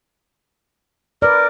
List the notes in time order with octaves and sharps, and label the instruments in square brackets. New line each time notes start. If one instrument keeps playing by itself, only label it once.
[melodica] A#4 [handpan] B4 D5